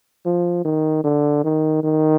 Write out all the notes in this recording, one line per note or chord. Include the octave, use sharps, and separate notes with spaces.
F3
D#3
D3
D#3
D#3